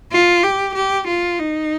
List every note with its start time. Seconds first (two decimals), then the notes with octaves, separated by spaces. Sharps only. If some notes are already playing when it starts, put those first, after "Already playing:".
0.12 F4
0.43 G4
0.75 G4
1.08 F4
1.39 D#4